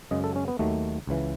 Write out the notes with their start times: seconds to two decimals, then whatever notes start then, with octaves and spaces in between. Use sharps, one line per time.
0.11 F#2 C#3 G#3 D#5
0.24 A4
0.36 C#4
0.48 B3
0.59 D#2 D#3 F#3 A3
1.07 C#2 C#3 E3